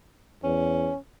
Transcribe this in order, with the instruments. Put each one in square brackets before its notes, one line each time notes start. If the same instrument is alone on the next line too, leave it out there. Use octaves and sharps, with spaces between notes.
[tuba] E2 [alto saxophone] C#4